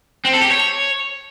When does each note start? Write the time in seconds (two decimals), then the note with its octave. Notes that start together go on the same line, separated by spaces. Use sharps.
0.25 C4
0.33 A4
0.42 G4
0.51 C#5